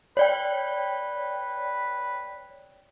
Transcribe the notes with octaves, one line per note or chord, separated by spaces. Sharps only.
B4 C#5 D5 G5